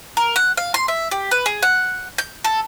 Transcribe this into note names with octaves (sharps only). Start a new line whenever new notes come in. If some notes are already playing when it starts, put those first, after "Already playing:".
A#4
F#5
F5
C6
E5
G4
B4
G#4
F#5
G6
A4